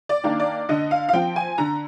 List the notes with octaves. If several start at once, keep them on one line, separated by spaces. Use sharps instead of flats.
D5
D#3 A#3 D4
D5
D3 D#5
F5
F5
F3 C4 G5
G#5
D3 A#5